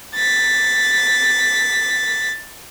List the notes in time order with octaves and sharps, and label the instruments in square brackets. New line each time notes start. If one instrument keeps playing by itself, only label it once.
[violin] A6 B6